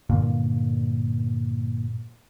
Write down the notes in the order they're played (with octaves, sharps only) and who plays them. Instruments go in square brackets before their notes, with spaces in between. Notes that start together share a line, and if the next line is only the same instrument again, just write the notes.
[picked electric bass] G2 A#2 D3 A#3